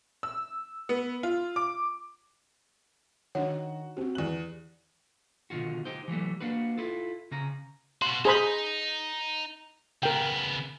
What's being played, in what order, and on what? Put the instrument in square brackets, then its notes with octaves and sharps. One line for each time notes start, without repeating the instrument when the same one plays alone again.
[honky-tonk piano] E6
B3
F4
D6
[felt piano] D#3 [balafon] D4 C#5 [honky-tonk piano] F#4
[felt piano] C4 F#4 [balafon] G4
[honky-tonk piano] E2 F#7 [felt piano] D5 F#6
[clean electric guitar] B2 D3 D#3 F4 F#4
D#4 G4 C5
E3 F#3 G3 A3
A#3 D4 F#4 B4
E4 F4 A4
C#3 C#4 A#5
[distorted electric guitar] B2 F#4 [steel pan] C6
[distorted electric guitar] D#4 [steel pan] G#4 C5 B5
[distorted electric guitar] C#3 B3 [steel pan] A#4 G5